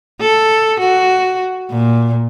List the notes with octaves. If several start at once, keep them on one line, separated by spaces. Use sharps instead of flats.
A4
F#4
A#2